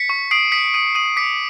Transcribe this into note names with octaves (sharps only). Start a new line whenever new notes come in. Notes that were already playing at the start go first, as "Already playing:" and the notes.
Already playing: B6 C#7
C#6
D#6 C7 D7
D#6 B6 C#7
D#6 C#7 D#7
D#6 C#7 D#7
D6 B6 C#7